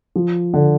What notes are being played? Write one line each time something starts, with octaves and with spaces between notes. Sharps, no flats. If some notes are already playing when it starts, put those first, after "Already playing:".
F3
D3